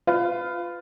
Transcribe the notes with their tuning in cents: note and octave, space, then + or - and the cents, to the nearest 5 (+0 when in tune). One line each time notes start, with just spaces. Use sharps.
F4 +0 B4 +30